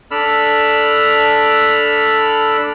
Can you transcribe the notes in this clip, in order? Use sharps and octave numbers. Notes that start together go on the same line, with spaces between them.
D4 A4 D5 B5 E6 F6